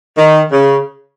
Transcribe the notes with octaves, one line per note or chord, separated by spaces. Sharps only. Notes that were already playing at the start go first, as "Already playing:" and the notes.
D#3
C#3